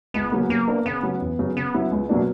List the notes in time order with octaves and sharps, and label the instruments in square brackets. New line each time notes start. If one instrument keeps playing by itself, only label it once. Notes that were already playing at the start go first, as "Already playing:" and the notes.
[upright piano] C#2 [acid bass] B3
[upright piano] C#3 F#3 A#3
[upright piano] F#3 [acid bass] A#3
[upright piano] B3 D4 A#4 D5
[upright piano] C#3 [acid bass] B3
[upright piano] F#3 C#4
E2
C#3 F#3
[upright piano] C#3 [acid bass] B3
[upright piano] F#3 C#4 E4
C#2
B2 F#3 A#3 D4